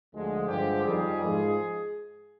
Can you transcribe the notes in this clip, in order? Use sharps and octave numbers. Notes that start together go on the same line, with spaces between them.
D2 D3 F3 G#3
G2 D3 F3 G#3 G4
F2 D#3 G3 G#4
G#2 F3 G#3